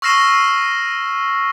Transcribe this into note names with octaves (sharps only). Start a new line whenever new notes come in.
C#6 E6 F6 A#6 C7 E7